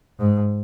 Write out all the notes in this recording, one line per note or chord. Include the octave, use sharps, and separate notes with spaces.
G#2